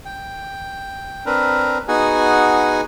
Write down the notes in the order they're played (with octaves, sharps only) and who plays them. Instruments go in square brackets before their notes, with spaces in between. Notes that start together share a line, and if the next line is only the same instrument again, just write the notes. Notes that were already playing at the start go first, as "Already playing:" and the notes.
[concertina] G5
C4 D4 A#4 B4
B3 D#4 F#4 G#4 F#5 G#5